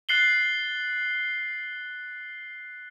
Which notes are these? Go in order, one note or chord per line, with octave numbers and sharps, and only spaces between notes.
F#6 A6 C7 F#7 G7